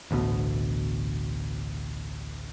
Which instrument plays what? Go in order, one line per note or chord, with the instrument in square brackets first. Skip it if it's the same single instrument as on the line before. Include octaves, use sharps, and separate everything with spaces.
[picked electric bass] A1 D2 B2